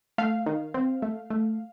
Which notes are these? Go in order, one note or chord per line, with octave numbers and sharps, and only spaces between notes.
A3 F5
D#3
C4
A3
A3